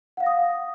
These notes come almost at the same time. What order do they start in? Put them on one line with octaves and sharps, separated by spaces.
F#5 F5 A#6 D#6